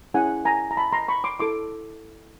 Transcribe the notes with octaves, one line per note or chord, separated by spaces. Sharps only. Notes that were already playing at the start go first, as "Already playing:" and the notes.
C#4 E4 G#4 F#5 G#5
G#5 A#5
A#5
A5 B5
A#5 C6
B5 C#6
C6 D6
E4 A4 C6 D6